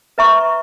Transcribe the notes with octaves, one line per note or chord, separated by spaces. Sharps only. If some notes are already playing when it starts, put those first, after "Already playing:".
B4 E5 A#5 C#6